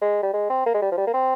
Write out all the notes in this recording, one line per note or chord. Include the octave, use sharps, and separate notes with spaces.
G#3
G3
G#3
C4
A#3
G#3
G3
F3
G3
A#3
C4